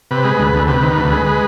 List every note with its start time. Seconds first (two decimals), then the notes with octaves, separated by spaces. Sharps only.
0.11 C3 B4
0.24 G#3
0.39 D2
0.53 D2
0.68 C3 B4
0.82 D#3
0.98 D2
1.12 G#3
1.26 G#3